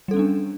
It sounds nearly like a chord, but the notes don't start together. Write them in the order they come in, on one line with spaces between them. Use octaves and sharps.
G3 A4 C#4 B3 D4